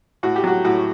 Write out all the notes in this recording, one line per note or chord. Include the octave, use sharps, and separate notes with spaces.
A2 F#4
G4
F#3 F#4
A2 F#4